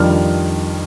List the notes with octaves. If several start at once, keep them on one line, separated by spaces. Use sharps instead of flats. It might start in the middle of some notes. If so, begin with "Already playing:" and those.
Already playing: F2 D#3 G3 D4 F4 F6